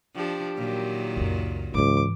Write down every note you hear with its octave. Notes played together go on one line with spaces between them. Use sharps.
F3 D4 G4
A#2 D#3 F#3
C#2 F#2
C#2 G#2 E3 D6